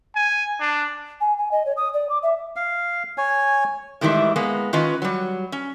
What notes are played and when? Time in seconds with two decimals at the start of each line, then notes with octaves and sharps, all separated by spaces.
0.16 G#5
0.60 D4
1.21 G#5
1.38 G#5
1.52 D#5
1.66 C#5
1.77 D#6
1.94 D5
2.10 D6
2.23 E5
2.56 F5
3.18 C#5 G#5
4.01 A2 D#3 E3 G3 G#3 E5
4.36 G#3 A#3 B3
4.73 D#3 C#4 F4 B4 D#5
5.02 F#3 G3
5.52 C#4